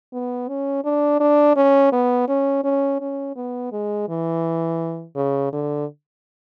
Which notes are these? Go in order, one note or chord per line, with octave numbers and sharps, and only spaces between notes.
B3
C#4
D4
D4
C#4
B3
C#4
C#4
C#4
B3
G#3
E3
C#3
D3